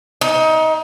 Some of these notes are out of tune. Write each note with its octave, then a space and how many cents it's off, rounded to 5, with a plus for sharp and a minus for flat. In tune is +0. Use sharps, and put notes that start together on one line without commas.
D#4 +25